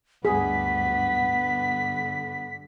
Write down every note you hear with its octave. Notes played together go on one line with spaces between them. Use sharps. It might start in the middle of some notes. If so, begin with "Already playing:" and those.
D2 G2 B3 G#4 B6
G2 D3